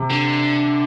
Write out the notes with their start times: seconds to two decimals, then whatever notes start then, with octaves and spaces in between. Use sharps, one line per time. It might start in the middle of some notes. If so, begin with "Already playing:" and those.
Already playing: C3
0.10 D3